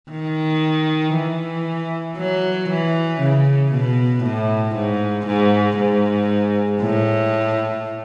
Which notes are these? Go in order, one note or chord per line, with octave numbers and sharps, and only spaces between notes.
D#3
E3
F#3
E3
C#3
B2
A2
G#2
G#2
G#2
A2